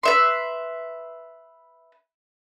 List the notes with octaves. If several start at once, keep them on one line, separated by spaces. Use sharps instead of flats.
B4 E5 C6